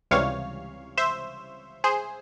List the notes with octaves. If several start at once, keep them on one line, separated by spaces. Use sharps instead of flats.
C#2 C3 E3 G3 C#5 F5
C5 E5
G#4 C5